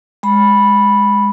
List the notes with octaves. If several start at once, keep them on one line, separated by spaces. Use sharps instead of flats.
G#3 B5